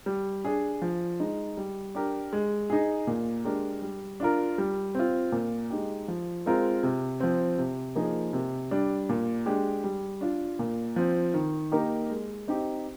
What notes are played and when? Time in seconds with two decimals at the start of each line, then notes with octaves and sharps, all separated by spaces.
0.06 G3
0.45 D4 G#4
0.82 F3
1.20 G#3 D#4
1.57 G3
1.95 D4 G4 A#4
2.33 G#3
2.70 D#4 G#4
3.07 A#2
3.45 G#3 D4 G4 A#4
3.82 G3
4.20 D4 F4 A#4
4.58 G3
4.95 C4 F4
5.32 A#2
5.70 G#3 D#4 G4
6.08 F3
6.46 G#3 C4 F4 A#4
6.83 C3
7.20 F3 C4
7.58 C3
7.95 F3 A#3 D#4 G#4
8.33 C3
8.71 G3 D4
9.09 A#2
9.46 G#3 D4 G4
9.84 G3
10.21 D4 F4
10.59 A#2
10.96 F3 C4
11.34 D#3
11.72 A#3 D#4 G4 A#4
12.10 G#3
12.48 C4 D#4 G4